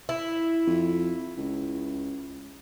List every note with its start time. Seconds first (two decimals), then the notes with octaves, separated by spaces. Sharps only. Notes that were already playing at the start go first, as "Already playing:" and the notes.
0.09 E4
0.66 F2
1.37 C#2